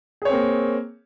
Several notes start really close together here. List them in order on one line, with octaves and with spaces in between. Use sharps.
G#4 C#5 C4 A#3